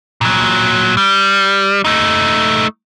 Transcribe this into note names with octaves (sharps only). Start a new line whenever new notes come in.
A#2 F#3
G3
A3 D#4